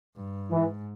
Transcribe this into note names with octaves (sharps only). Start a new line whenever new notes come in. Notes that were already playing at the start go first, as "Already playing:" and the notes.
G2
G#2 E3